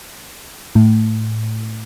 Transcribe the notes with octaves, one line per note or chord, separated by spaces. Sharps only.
A2